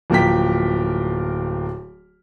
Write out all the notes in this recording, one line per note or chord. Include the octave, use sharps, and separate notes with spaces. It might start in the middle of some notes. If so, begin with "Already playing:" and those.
D1 F3 A#3 A#4 G5 B6